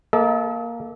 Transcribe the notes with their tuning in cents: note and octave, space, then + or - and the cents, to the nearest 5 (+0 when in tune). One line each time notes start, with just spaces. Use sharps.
A#3 +0 A4 -20 D#5 +45